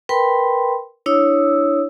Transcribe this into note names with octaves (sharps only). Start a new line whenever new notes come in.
A#4 B4 G5 B5 C6
D4 E4 C#5 D#6 E6